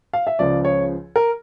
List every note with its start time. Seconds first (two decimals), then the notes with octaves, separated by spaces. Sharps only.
0.13 F5
0.27 E5
0.39 C#2 C#3 F3 D5
0.65 C#5
1.16 A#4